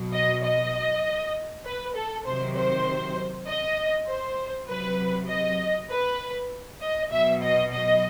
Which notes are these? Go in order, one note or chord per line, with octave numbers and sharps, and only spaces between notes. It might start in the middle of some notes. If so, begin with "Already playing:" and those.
Already playing: B2 F#3
D#5
D#5
B4
A4
C3 D#3 F#3 C5
C5
D#5
C5
C3 F#3 B4
D#5
B4
D#5
B2 F#3 E5
D#5
D#5